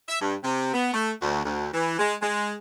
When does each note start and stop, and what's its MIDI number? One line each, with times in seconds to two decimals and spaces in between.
0.09 0.20 76
0.20 0.35 43
0.43 0.72 48
0.74 0.93 59
0.93 1.11 57
1.21 1.44 38
1.44 1.67 38
1.73 1.96 52
1.98 2.14 56
2.22 2.54 56